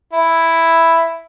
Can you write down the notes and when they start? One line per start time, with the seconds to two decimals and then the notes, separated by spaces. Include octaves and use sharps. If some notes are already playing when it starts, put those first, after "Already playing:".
0.13 E4